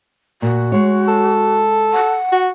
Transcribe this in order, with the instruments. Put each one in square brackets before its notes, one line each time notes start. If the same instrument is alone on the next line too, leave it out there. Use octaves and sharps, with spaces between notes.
[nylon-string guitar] A#2 [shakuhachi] F#4
[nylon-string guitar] G#3 C#5
[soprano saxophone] A4
[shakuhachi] F#5
[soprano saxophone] F#4